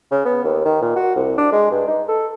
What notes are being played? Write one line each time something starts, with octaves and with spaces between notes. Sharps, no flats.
C#3
B3
D#2
D#3
A#2
F#4
C2
D4
G#3
G2
D#4
A4